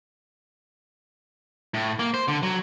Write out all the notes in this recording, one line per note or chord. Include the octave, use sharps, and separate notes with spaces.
A2
A#3
C5
D3
F#3